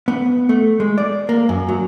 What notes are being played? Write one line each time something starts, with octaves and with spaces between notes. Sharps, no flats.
B3
A3
G#3
D5
A#3
F#2
F#3